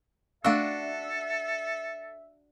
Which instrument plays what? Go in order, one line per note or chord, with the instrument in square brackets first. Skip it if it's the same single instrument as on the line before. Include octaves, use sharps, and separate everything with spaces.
[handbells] A3 F5 E6 [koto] D4 F#4 [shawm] A4 [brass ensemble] E5